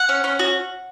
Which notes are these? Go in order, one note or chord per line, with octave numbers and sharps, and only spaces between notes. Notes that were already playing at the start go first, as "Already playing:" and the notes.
Already playing: F#5
C#4
C#4
F#4